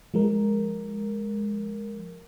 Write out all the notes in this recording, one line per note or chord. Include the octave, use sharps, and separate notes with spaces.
F3 G#3 A#4